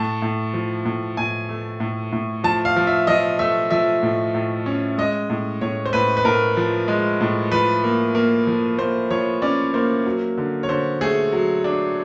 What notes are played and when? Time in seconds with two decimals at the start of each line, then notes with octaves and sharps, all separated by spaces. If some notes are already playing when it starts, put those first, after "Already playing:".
Already playing: A2 A5
0.22 A2
0.54 F3
0.85 A2
1.17 A2 G#5
1.49 A3
1.80 A2
2.12 A2
2.44 F3 A5
2.65 F5
2.76 F3
2.87 E5
3.07 F3 D#5
3.39 A3 E5
3.71 F3 E5
4.03 A2
4.35 A2
4.66 C#4
4.98 G#3 D#5
5.30 A2
5.61 A2 C#5
5.86 C5
5.93 A2 B4
6.17 B4
6.25 A2 A#4
6.57 F3
6.88 G#3
7.21 A2
7.52 F3 B4
7.84 A#3
8.15 A#3
8.47 F3
8.78 A#3 C5
9.10 F3 C#5
9.42 C#4 D5
9.74 A#3 C5
10.05 F#3
10.38 D3
10.63 C#5
10.69 D3 C5
11.01 A3 G#4
11.32 F#3
11.64 D4